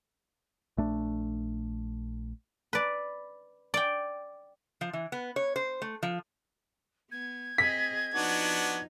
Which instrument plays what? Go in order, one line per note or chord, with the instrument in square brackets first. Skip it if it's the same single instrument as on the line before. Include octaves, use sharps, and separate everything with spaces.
[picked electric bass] A#1 A3 D4
[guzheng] B4 D5
D5 G5
[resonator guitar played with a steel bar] F3
E3
B3
C#5
C5
A3
F3
[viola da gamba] B3 [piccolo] G#6
[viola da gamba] C4 G#4 D#5 [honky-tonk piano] B6
[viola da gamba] F3 D#4 [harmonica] B3 D4 F#4